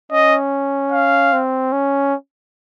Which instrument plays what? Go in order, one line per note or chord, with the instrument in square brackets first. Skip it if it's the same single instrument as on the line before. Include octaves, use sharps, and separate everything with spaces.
[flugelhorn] C#4 [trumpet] D#5
[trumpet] F5
[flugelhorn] C4
C#4